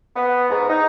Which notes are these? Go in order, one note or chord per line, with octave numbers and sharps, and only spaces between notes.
B3
G#2
D#4